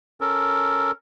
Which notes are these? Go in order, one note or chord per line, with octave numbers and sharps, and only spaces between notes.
C#4 A4 A#4